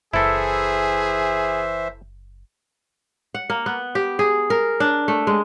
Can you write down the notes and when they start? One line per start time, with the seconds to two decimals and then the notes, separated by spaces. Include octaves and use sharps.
0.14 F#1 E3 E4 G#4 A4 C5 E5
3.34 F#5
3.50 A#3
3.66 B3
3.95 G4
4.19 G#4
4.50 A#4
4.80 D4
5.08 A3
5.27 G#3